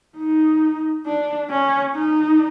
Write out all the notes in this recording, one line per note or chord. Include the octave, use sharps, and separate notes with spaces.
D#4
D4
C#4
D#4